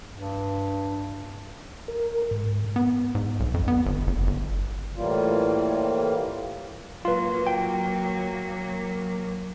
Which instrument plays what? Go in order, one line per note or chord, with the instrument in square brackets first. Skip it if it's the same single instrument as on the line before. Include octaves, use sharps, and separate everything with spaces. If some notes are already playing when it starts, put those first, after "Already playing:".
[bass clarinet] G2
[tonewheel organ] A#4
G#2
[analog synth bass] B3
G#2
B1
F2
B3
G1
F#1
G1
[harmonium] A2 E3 G3 A#3 F4
[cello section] F#3 A#3 [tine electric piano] F4 B4
[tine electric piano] G5